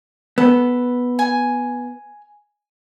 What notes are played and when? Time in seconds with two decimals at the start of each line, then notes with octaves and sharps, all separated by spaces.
0.38 B3 A4
1.19 G#5